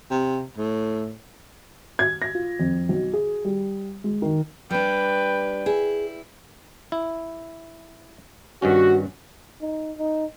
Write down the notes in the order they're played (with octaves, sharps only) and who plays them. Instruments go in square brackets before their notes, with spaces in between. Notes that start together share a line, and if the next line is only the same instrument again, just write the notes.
[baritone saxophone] C3
A2
[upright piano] G#6
A#6
F4
F2
B1
G#4
G3
G#3
D#3
[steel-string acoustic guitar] G3 D4 [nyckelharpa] B4 G5
[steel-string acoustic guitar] E4 [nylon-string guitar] G#4
[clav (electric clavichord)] E4
[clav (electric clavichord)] G2 D#3 C#4 [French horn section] F#4
[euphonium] D#4
D#4